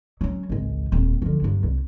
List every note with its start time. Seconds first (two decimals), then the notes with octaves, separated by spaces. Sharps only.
0.21 F#3 C#4
0.49 G#1 C#2
0.92 D#1 C4
1.22 D3 F3
1.42 G2 F#3
1.63 C2